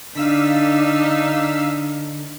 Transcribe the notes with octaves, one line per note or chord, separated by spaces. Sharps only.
D3 D4 D#4 F5 E6 B6